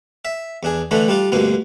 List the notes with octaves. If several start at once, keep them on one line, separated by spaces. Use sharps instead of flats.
E5
E2 D4 G#4
D3 E3 A3 D4
G3 D4 F4
D2 G2 B2 A#3